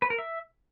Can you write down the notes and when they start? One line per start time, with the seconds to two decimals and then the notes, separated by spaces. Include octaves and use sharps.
0.02 B4
0.10 A#4
0.18 E5